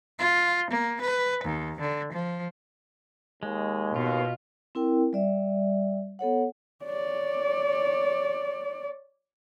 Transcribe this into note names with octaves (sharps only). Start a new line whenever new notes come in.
F4
A#3
B4
D#2
D3
F3
D#2 G#3
B2 F4
C4 E4 A#4 G5
G3 D5 E5
B3 A4 C#5 F#5
C#5 D5